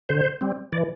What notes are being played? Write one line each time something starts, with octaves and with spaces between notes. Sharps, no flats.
D3 C5
G3 C4
E3 D5